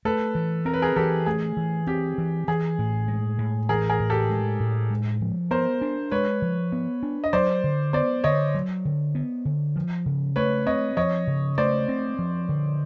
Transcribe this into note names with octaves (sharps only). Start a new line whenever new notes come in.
A3 A4 B4
E3
C4 A#4
B4
G#4 A#4
E3 G4 A4
A3 G#4
E3
C4 G4
E3
E3 G#4
A2
G#3
A2
E3 G#4 A#4
G#4 A#4
A2
G4 A4
G#3
A2
G#3
F3
B3 A#4 C5
D4
G#3 B4 C#5
F3
B3
D4
D#5
F#3 C5 D5
D3
B3 C5 D5
D3 C#5 D#5
F#3
D3
B3
D3
F3
C#3
A3 B4 C#5
C4 C#5 D#5
F3 C#5 D#5
C#3
A3 C5 D5
C4
F3
D3